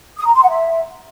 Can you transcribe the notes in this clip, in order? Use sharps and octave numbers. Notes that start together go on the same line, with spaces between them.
D#6
A#5
C6
F#5
E5